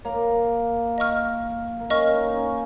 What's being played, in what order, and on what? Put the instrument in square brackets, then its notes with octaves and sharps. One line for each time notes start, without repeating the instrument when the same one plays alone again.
[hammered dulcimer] A#3 [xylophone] C#5 F5 A#5
[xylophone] D#5 C#6 F6
[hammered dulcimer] A#3
[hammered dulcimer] C#4 [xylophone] D#5 C#6 F6
[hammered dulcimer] D#4
D#4
C#4